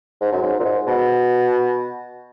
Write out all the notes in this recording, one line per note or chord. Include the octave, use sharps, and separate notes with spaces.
G#2
F#2
G#2
A#2
G#2
B2